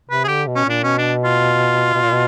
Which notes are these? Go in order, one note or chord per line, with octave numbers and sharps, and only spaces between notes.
C3 B4
G#4
D3 G4
B2
C#4
A#2 D4
B2 C#4
D4
F4
B2
A#2
B2